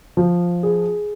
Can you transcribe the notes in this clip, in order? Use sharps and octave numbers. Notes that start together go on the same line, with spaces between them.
F3
G#4